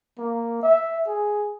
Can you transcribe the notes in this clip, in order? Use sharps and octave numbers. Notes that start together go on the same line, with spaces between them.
A#3
E5
G#4